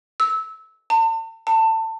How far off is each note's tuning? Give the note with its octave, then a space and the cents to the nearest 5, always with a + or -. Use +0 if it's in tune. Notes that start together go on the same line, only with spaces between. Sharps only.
E6 -20
A5 +40
A5 +25